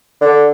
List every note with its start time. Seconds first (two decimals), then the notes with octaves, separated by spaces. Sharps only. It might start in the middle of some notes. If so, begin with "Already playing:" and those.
0.21 D3